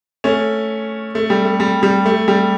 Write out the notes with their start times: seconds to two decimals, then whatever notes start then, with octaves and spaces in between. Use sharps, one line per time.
0.24 A3 C#4
1.15 A3
1.30 G3
1.45 A3
1.60 G3
1.83 G3
2.06 A3
2.28 G3